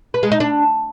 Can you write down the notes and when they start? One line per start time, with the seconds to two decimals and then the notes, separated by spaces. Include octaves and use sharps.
0.14 B4
0.23 G#3
0.32 D#4
0.40 D4